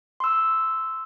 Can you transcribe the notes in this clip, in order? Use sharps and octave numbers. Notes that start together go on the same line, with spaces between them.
C6 E6